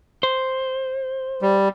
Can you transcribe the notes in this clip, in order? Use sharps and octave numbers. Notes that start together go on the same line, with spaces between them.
C5
G3